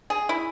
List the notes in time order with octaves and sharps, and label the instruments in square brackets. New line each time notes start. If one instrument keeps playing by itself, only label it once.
[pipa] G#4
E4